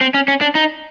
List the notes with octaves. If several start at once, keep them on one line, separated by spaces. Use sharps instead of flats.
C4
C#4
C#4
D4
D#4